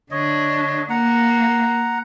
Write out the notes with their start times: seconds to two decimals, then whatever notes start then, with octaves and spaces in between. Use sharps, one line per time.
0.11 D3 D4 C#5 D#5
0.90 A#3 F#5 A#5